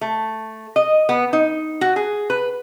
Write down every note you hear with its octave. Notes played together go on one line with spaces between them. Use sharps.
A3
D#5
B3
D#4
F#4
G#4
B4